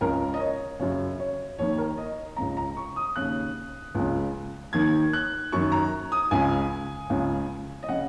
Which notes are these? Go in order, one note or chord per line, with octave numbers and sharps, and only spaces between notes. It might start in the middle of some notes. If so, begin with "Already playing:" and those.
C#2 C#3 A#4
D#5
C#5
F#2 C#3 C#5
C#5
D#2 D#3 C#5
A#4
D#5
C#2 C#3 A#5
A#5
C#6
D#6
D#2 C#3 F#6
C#2 C#3
D#2 D#3 G#6
F#6
F#2 D#3 C#6
A#5
D#6
C#2 C#3 G#5
C#2 C#3
D#5
C#3 F#5